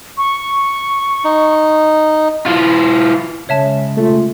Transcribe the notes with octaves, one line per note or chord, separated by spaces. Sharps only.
C#6
D#4
E3 F4
C#3 G#3 C#5 E5 A5
A3 F4